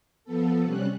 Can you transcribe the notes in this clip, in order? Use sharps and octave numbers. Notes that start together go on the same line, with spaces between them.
F3 B3 A4
C3 G3 C#4 F#6